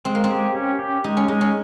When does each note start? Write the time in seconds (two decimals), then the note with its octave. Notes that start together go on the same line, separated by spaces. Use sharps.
0.05 G#3 C4
0.15 A#3
0.24 C4
0.30 G4
0.55 C#4
0.79 G4
1.04 G#3 D#4
1.17 C#4
1.28 G#3 D#4
1.41 C#4